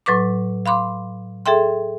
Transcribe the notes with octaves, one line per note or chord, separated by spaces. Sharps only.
A2 F#3 B4 C#6 D6
F5 B5 C6 D6
G#4 A4 E5 G5 C6